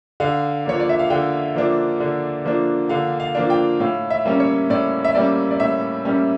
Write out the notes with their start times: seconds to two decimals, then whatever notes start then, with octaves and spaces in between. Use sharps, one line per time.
0.20 D3 F5
0.65 F3 A#3 D4 C#5
0.80 D5
0.89 E5
0.99 F5
1.10 D3 G5
1.55 F3 A#3 D4
2.00 D3
2.45 F3 A#3 D4
2.89 D3 F5
3.20 F5
3.35 F3 A#3 D4
3.50 G5
3.80 A2 F5
4.10 E5
4.25 G3 A#3 C#4
4.40 C#5
4.70 A2 D5
5.05 E5
5.15 G3 A#3 C#4 D5
5.51 D5
5.60 A2 E5
6.05 G3 A#3 C#4